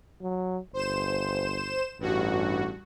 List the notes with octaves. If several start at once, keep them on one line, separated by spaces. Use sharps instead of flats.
F#3
G1 C5 E7
A1 G2 F#4